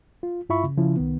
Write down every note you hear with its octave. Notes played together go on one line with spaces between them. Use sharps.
F4
G2 E4 F4 E5 B5 C#6
C#3
C#3 F3 E4
C2 D#3 B3